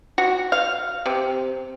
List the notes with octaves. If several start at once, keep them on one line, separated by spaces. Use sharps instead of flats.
F#4
F5
C3